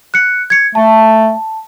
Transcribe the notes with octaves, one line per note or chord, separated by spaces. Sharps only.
F#6 C#7
G#6 C#7
A3 A5